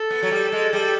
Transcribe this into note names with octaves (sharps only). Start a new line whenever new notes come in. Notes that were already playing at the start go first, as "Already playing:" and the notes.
Already playing: A4
B3
F#3
G3
G#3
G3